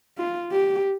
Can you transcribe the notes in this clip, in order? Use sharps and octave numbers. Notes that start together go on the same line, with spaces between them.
F4
G4